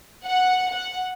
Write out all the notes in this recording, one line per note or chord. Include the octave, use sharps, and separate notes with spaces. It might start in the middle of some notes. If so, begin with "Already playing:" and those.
F#5
F#5